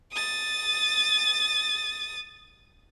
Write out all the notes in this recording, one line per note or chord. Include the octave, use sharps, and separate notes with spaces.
D#6 A6